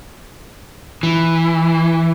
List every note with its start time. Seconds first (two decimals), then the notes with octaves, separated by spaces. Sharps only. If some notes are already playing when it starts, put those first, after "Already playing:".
1.03 E3